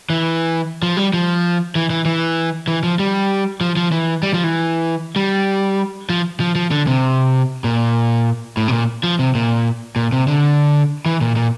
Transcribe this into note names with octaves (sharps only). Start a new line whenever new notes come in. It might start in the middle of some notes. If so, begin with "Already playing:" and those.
E3
F3
G3
F3
E3
E3
E3
E3
F3
G3
F3
F3
E3
G3
F3
E3
G3
F3
F3
F3
D3
C3
A#2
A2
C3
A#2
F3
C3
A#2
A#2
C3
D3
E3
A#2
A#2